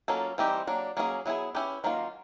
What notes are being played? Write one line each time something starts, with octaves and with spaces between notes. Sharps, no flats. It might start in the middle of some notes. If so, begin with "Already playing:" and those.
F#3 A#3 C#4 F4 A4
E3 G3 C4 D#4 G4
F#3 A#3 D4
F#3 A#3 C#4 E4 G#4
F#3 B3 E4 G#4
C#4 E4 G4 B4
D#3 F#3 A#3 C#4 F4